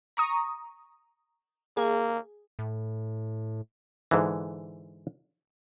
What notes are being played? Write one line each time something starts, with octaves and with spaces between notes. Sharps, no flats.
A#5 C#6 D#6
A#3 G#4
A2
G#2 D3 E3